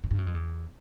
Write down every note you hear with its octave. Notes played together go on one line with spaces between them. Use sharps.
G#2
G2
F#2
F2
E2